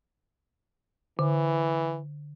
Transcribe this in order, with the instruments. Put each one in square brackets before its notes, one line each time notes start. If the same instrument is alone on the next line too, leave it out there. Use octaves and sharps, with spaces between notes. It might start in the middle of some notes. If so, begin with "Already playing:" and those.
[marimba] D3 [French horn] E3